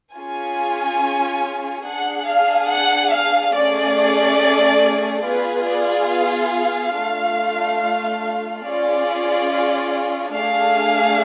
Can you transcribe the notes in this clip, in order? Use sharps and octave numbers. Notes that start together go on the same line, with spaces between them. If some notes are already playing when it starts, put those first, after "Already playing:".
C#4 F4 G#4 G#5
D4 G#4 F#5
F5
F#5
F5
A3 C#4 G#4 D5
B3 F4 G#4 B4
D5
F5
A3 D4 F4
C#4 F4 G#4 D5
A3 D4 G#4 F5